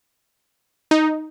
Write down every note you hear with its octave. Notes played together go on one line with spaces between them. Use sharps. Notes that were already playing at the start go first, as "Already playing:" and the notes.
D#4